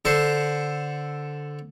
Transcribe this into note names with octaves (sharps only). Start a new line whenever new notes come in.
D3 A4 C5